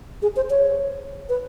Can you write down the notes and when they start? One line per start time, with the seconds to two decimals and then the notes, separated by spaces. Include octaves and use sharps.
0.22 G#4
0.36 C5
0.50 C#5
1.29 B4